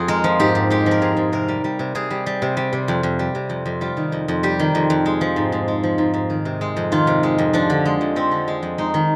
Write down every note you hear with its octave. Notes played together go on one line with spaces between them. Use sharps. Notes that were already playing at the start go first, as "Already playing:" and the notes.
Already playing: F2 F4 G#4
G#3 A#4
F3
G#2 G4
G#2
G#3 G4
F3
A#4
G#2 G#4
G#2
C3 A#4
G3
G3
C3
C3 G#4
G3
G3
C3
G3
C3
F2
F2
G3
C3
F2
F2
G3 F4
D#3
F2
F2
G3 G4
D#3
F2
F2
G#3
F3
G#2
G#2
G#3
F3
G#2
G#2
D#3
C3
G#3
F2
D#3 F4
C3
G#3
F2
F3 D4
D3
G#3
F2
F3 C4
D3
G#3
F2
G#3 D#4
D#3